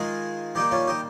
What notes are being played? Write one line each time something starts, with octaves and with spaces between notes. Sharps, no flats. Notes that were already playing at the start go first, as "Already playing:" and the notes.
Already playing: D#3 G#3 F4 G#4
D#3 G3 A#3 D#4 G4
C#4 F4
D#4 G4